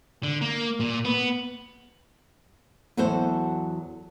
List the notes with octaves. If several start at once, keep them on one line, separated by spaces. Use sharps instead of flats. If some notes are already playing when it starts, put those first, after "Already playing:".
D3
A#3
A#2
B3
E2 F#3 F#4 A4 C5